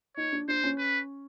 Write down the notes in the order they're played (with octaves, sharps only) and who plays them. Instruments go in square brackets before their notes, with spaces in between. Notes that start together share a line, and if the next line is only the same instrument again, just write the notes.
[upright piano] D#4 [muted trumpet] C#5
[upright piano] D4
[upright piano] D4 [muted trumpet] C5
[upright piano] C#4
[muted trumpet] B4